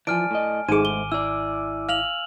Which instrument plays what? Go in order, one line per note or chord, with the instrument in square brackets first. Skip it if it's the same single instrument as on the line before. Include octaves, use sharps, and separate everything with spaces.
[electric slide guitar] E3 F3 [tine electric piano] D5 A5 [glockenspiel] G#5 F6 D7
[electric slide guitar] A2 D#5
[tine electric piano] G#1 D6 [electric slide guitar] G#2 A3 C5 [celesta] D#4 G#4 [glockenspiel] D#7
[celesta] G7
[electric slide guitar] E4 D5 [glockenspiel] E6
[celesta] F5 [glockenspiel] F6 F7 F#7